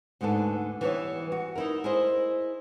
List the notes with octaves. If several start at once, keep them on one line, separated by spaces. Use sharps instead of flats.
D2 G#2 D3 B3 A4
E3 G3 B3 A4 C#5 E5
F#4
D#4 E4 A#4
E4 G#4 A#4 C5 D#5